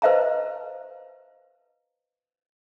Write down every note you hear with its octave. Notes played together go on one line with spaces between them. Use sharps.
B4 C5 D#5 F5 A5 A#5